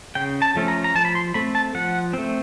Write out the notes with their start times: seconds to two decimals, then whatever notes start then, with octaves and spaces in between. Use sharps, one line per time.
0.15 C#3 G5
0.42 A5
0.56 F3 A3 C#4
0.68 A#5
0.84 A#5
0.95 F3 A5
1.05 B5
1.15 C6
1.34 A3 C4 B5
1.55 A5
1.75 F3 F#5
2.13 A3 C4